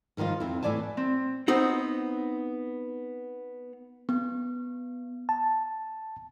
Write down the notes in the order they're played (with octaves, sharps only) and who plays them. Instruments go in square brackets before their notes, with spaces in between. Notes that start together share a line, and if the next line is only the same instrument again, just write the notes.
[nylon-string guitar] G2 D#3 F3 D#4 F4
F2 E4
A2 E3 D5 G#5 A5
[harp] C4
[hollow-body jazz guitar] B3 C4 D#4 F#4
[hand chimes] B3
[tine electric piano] A5